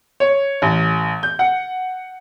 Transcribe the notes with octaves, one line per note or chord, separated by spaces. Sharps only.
C#5
A1
G6
F#5